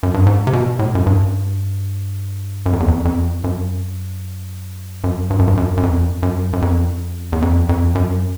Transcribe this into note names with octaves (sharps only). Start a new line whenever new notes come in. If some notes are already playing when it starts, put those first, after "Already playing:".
F#2
G2
G#2
C3
B2
A2
F#2
G2
F#2
F2
E2
F2
F2
F#2
F#2
G2
F#2
G2
F#2
F#2
F2
F#2
F#2
F2
E2
F2
F2
F#2